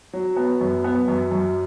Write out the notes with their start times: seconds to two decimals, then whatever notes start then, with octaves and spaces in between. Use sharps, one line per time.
0.13 F#3
0.37 B3
0.61 F#2
0.84 B3
1.08 F#2
1.31 F#2